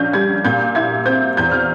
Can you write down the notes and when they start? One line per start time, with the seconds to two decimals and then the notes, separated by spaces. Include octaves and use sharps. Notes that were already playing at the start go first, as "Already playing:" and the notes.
Already playing: A#1 C#4 G6
0.13 G3 G#6
0.45 A#2 G6
0.75 E4 G#6
1.06 C4 G6
1.37 E2 G6
1.52 F6